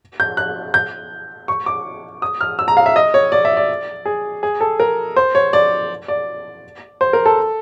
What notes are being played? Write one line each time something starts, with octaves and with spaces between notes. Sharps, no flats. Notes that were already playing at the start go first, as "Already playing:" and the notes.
G6
F#6
G6
C#6
D6
D#6
F6
E6
A#5
F5
E5
D#5
C#5
D5
E5
D5
G#4
G#4
A4
A#4
C5
C#5
D5
D5
C5
A#4
A4